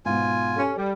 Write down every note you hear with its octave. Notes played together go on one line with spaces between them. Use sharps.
G#2 B2 F4 G#5
C#4 G4 A4
G3